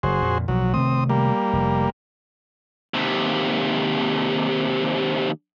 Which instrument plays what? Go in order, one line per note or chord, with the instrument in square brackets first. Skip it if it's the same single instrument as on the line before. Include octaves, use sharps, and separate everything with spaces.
[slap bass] F#1 [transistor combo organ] F#4 G#4 C5
[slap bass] F2 A#2
[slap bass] B1 F3 [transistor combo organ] F#3
[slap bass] C3 D#3 A3 [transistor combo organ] C4 D#6
[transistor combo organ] G3 A#3
[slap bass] F1
[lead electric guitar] D#2 C3